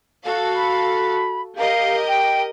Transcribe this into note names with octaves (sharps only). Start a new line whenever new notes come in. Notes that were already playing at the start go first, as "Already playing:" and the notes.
F#4 A4 F5
B5
G4 A#4 D#5 F5
G5